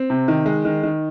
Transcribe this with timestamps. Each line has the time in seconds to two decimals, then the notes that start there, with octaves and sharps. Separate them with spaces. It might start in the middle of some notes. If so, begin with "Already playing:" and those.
Already playing: C4
0.10 C3
0.28 D#3
0.46 G#3
0.65 D#3
0.83 D#3